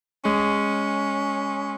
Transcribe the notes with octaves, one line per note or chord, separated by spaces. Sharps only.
G#3 C#4